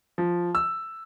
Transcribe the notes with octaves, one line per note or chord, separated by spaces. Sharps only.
F3
E6